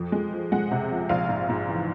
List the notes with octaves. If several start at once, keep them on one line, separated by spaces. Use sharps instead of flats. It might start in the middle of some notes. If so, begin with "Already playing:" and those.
Already playing: F2
G#3
F3
G#3 F#5
C3
F3
A#1 F5
G#2
G#2
E3